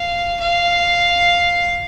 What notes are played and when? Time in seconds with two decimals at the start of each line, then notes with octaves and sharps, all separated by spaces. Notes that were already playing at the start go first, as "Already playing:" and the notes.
Already playing: F5
0.40 F5